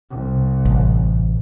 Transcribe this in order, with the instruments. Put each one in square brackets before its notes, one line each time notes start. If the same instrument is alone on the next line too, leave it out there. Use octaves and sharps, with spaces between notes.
[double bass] C2
[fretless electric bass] A1